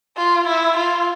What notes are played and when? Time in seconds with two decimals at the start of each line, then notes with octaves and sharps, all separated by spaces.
0.17 F4
0.47 E4
0.77 F4